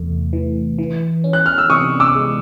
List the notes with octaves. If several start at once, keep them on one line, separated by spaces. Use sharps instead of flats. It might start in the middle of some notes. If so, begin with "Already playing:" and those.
Already playing: E2 C3 A3
E3
E3
C#4
F#6
F6
E6
C3 C#6 D#6
D6 E6
G#3